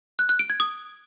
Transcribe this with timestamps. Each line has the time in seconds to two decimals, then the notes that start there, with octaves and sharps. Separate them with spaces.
0.19 F#6
0.29 F#6
0.39 D7
0.50 G#6
0.60 D#6